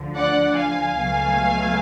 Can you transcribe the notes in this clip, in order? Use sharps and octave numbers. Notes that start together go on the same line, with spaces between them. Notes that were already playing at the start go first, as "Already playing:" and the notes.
Already playing: D2 D3 F3
D5 F#5
F5 G#5
C#2 B2 F#3 A3